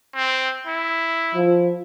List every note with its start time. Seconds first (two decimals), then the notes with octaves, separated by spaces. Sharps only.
0.15 C4
0.67 E4
1.35 F3